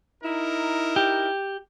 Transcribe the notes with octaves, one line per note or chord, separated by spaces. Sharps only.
D#4 E4 A#4
G4